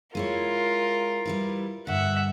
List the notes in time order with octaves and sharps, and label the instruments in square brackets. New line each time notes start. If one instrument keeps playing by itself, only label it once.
[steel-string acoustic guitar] G#3 E4 C#5 [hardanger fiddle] F4 A#4
[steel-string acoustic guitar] G3 E4 B4
[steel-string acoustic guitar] G2 D3 [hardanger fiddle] E5 F#5